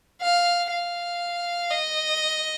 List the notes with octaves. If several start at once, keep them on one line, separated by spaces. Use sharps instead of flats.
F5
F5
D#5